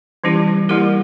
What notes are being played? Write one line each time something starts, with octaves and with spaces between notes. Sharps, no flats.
E3 G3 C#4 E4 G4
G3 A#3 E4 G4 A#4